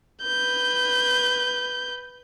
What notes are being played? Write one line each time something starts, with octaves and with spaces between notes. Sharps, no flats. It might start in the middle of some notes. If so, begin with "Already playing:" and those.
B4 G6